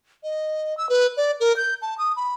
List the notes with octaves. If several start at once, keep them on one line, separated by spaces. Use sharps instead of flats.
D#5
E6
B4
D5
A#4
G6
A5
D#6
B5